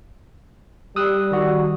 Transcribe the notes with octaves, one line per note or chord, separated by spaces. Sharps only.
G3 D#6 E6 F#6
D#3 F#4